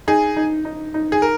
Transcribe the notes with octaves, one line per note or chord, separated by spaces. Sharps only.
D#4 G#4
D#4
D#4
D#4
G#4
A#4